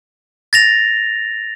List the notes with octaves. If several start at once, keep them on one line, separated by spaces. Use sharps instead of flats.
A6 A#6 F7